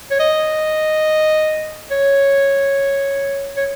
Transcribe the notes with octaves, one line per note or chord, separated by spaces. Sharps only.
C#5
D#5
C#5
C#5